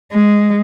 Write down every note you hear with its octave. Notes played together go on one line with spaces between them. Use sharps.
G#3